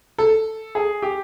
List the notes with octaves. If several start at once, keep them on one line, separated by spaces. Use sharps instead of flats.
A4
G#4
G4